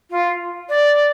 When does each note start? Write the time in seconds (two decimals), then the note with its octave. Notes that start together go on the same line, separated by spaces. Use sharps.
0.10 F4
0.69 D5